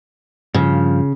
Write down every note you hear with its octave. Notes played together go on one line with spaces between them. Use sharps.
G2 C#3 F3